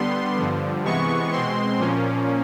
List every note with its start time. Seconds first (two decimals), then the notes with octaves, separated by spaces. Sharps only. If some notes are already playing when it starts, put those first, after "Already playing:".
Already playing: D3 G3 B3 C6
0.37 G2 D3 F3
0.84 C3 E3 G#3 B3 C#6
1.32 B2 G#3 C4 C6
1.78 A#2 F3 A#3 C#4